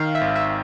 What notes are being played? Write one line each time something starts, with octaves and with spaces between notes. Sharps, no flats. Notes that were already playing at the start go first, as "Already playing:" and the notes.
Already playing: D#3 F5
E5
G#1
E5